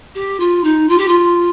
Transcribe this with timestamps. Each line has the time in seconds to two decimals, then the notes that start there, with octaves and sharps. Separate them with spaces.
0.15 G4
0.40 F4
0.64 D#4
0.89 F4
0.98 G4
1.08 F4